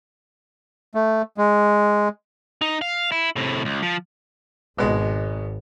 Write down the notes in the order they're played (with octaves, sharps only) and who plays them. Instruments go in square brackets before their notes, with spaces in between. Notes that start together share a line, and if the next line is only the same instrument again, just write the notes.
[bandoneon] A3
G#3
[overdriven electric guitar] D#4
F5
E4
A2 C3
C#2
F3
[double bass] G#1 [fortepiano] B2 G#3